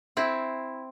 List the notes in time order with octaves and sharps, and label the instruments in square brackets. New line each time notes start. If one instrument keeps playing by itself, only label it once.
[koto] C4 E4